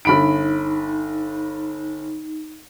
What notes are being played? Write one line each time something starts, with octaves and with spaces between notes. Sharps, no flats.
G1 D#4 B5 D7